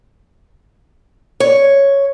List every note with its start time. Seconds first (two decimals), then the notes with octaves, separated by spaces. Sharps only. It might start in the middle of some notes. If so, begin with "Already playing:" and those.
1.40 C#5